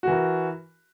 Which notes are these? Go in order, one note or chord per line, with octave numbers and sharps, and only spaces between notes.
E3 F#4 A#4